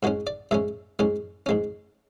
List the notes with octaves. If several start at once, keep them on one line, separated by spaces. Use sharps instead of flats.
G#2 G#3 C#4 F#4
D5
G#2 G#3 C#4 E5
G#2 G#3 C#4
G#2 G#3 C#4